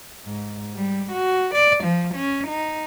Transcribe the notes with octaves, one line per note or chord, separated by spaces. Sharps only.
G#2
G3
F#4
D5
F3
C#4
D#4